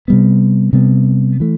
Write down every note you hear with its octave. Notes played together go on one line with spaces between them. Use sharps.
C3 G3 B3
C3 G3 B3
E3 A3